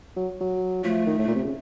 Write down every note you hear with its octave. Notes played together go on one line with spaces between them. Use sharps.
F#3
F#3
F3 A3
D#3
A2
A#2
C3
C#3